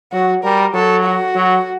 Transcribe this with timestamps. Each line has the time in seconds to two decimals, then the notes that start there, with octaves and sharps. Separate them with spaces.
0.12 F#3 F#4
0.43 G3 A#4
0.74 F#3 A4
1.04 F#4
1.35 F#3